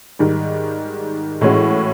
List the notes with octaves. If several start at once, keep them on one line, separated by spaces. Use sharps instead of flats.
G#2 D#3 G3
A2 E3 G#3 C#4 F#4